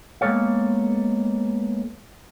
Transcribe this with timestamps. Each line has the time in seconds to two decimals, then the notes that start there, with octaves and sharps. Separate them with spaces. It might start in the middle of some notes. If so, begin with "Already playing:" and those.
0.21 G#3 A#3 B3 A4 C#5 F5